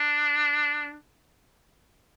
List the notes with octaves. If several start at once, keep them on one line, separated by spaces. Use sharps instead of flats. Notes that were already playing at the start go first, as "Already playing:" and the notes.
Already playing: D4